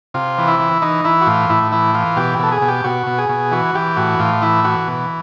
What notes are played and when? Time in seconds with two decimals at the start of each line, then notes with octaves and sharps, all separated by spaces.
0.14 C3 F4
0.38 E3
0.48 E4
0.60 E3
0.82 E3 D#4
1.04 E3 E4
1.21 F#4
1.27 A2 F4
1.49 A2 E4
1.72 E3 E4
1.94 E3 F4
2.17 B2 G4
2.39 B2 A4
2.52 G#4
2.62 B2
2.68 G4
2.84 B2 F#4
3.07 B2
3.18 G#4
3.29 B2
3.52 E3 F#4
3.75 E3 G4
3.96 A2 F#4
4.19 A2 F4
4.42 E3 E4
4.64 E3 F#4
4.88 B2